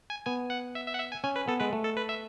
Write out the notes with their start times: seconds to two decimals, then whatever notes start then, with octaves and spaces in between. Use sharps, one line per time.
0.10 G#5
0.26 B3 G#5
0.50 F#5
0.75 E5
0.87 E5
0.94 F#5
0.99 E5
1.12 G#5
1.23 C#4 G#5
1.36 B4
1.48 B3 A4
1.60 G#3 B4
1.73 A3
1.84 A4
1.97 B4
2.09 E5